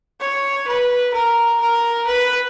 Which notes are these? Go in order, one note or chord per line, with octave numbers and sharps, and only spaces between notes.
C#5
B4
A#4
A#4
B4